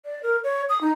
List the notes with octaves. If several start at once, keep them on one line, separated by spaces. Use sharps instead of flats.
D5
A#4
C#5
D#6
D#4